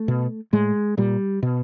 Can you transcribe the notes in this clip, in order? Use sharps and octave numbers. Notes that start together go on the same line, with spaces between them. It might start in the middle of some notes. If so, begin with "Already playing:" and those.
Already playing: A3
B2
A2 G#3
A#2 G3
B2